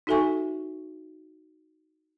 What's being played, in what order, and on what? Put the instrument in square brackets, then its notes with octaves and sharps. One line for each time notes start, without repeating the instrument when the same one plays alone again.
[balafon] D#4 F#4 A4 E5 G#5 C#6